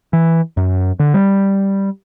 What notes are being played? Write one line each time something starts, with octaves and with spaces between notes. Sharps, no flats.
E3
F#2
D3
G3